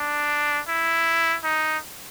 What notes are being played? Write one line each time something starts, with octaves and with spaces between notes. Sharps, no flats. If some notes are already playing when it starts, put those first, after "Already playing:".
Already playing: D4
E4
D#4